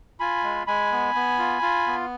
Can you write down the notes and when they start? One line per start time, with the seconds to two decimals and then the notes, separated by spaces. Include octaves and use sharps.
0.20 F4 G#5 B5
0.43 G#3
0.67 G#3 G#5 B5
0.91 B3
1.15 B3
1.39 F4
1.62 F4
1.87 B3